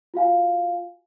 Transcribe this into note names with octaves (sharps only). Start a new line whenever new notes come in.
F4 F#4 F5 G#5